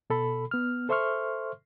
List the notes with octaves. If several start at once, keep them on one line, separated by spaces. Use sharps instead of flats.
B2 A4 B5
B3 F6
A4 C5 E5 C6 C#6 F6